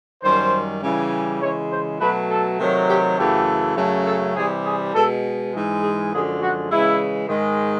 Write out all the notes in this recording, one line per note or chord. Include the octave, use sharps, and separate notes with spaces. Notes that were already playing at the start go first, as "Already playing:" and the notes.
F#2 D#3 G3 C5
C#3 E3 G3
C#3 E3 G#3 C#5
C5
B2 F#3 A3 B4
A4
C3 D#3 F#3 A3
G4
F#2 C#3 E3 A3 G4
F#2 C#3 F#3 A3
A4
C3 E3 G3 G#4
G#4
B2 G#3 A4
G#2 E3 G#3
G#4
F#2 D3 F3 G#3 G#4
F#4
C#3 E3 G#3 E4
G#2 D#3 G#3